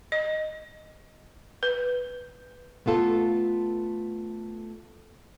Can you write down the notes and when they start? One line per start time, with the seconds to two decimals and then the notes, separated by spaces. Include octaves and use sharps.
0.12 D#5
1.63 B4
2.86 A3 B3 F4 A4